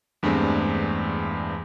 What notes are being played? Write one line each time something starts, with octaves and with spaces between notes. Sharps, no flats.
E2 G2 G#3 A3 C4 D4